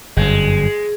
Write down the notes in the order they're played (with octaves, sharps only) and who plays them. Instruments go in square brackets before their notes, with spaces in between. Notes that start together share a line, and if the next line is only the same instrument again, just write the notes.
[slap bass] G1 F#2 [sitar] G#3